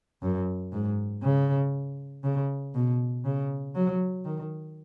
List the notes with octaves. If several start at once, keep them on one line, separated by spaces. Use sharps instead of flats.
F#2
G#2
C#3
C#3
B2
C#3
F#3
D#3